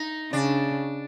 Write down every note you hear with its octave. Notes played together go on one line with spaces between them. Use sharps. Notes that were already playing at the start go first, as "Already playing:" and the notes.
Already playing: D#4
C#3 D4